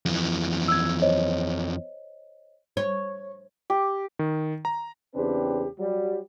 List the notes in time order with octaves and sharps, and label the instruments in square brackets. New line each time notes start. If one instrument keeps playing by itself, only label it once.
[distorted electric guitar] F2 E3
[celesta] E6 G#6
C5 C#5 D#5
[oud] C#5
[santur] G4
[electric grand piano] D#3
A#5
[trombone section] E2 C#3 C4 D4 G4 B4
F#3 G3